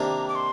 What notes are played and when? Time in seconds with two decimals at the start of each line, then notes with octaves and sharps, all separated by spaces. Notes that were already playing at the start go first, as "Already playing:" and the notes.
Already playing: C3 D#3 A#3 D4 A#5
0.28 D6
0.35 C6